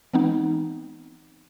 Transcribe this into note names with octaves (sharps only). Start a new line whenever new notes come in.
E3 G#3 B3 C4 D#4